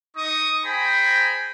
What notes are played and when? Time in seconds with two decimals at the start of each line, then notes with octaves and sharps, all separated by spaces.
0.17 D#4 D#5 C#6 D#6
0.65 G#4 C5 G5 G#5 A#5 B5